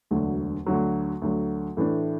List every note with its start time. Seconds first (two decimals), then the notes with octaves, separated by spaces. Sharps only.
0.11 E1 D2 D3 F#3
0.66 D2 D3 F#3
1.22 D2 D3 F#3
1.77 A2 E3 A3 D4